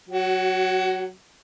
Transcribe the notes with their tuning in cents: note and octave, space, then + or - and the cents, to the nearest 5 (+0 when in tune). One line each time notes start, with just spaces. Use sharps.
F#3 +0 F#4 +30